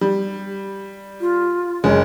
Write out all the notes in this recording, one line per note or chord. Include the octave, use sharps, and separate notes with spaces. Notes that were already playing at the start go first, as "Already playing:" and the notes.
G3
F4
F#1 G#3 C#5